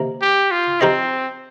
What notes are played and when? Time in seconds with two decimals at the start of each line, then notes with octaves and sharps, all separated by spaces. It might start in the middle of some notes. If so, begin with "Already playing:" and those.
Already playing: C3 D#3 A#3
0.22 G4
0.51 F4
0.81 F3 C4 D#4 G4 C5 D#5